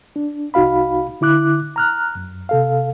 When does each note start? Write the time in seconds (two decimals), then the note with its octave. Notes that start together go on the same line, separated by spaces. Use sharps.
0.16 D4
0.54 C2 D#4 F#4 F5 B5
1.21 D3 E4 D6 F#6
1.76 A#5 F6 F#6
2.15 F#2
2.49 C3 A4 F5